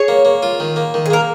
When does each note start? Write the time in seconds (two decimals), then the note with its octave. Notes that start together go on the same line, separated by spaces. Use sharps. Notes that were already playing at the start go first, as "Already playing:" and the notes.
Already playing: G#4 C#5
0.08 A#3
0.25 A#3
0.43 F4
0.60 D#3
0.76 A#3
0.94 D#3
1.06 G#4
1.10 A#3 A#4